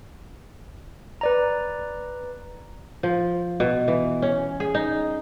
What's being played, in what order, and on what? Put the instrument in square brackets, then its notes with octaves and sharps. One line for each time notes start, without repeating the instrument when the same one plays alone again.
[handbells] B4 D5 A#5
[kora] F3
B2
E3
C#4
G#4
D#4